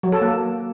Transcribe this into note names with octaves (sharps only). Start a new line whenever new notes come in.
F#3
A4
A#3